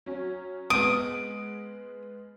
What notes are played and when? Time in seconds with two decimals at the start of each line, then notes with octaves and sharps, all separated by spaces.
0.06 F#3 C#4
0.70 G#3 B3 D#6 D7